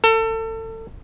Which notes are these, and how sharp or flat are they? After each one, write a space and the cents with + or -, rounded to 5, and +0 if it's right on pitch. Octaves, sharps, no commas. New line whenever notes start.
A4 +30